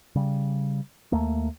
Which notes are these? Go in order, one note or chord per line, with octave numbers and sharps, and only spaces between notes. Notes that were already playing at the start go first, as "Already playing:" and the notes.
C#3 G3
D#2 A3 A#3